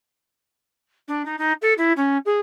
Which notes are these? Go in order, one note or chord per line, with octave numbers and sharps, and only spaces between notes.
D4
D#4
D#4
A4
E4
C#4
G#4